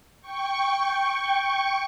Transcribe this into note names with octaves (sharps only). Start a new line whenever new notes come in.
G5 C#6